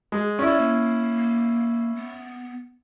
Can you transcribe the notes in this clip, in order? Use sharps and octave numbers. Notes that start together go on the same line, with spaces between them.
G#3
C#4 E4 D5
A#3
B3